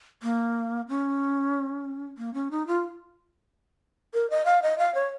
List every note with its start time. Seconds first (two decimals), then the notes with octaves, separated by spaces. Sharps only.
0.23 A#3
0.89 C#4
2.18 A#3
2.34 C#4
2.51 D#4
2.67 F4
4.14 A#4
4.30 D#5
4.45 F5
4.62 D#5
4.78 F5
4.95 C#5